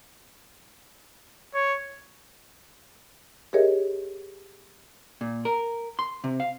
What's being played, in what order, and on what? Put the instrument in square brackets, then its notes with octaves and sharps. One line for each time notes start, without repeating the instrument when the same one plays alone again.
[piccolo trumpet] C#5
[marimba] G4 G#4 A#4 C#5 D#5 E5
[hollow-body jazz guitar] A#2
A#4
C6
C3
F5